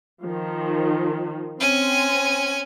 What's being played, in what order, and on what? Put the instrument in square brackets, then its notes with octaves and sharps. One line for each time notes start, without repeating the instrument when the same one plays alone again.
[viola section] D#3 F3
[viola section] C4 [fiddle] C#4 G#5